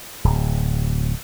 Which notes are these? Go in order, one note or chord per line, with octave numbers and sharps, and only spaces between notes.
D1